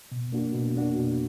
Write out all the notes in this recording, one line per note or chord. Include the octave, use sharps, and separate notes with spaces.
B2
A#3 D4 F#4
B2
A#3 D4 F#4
B2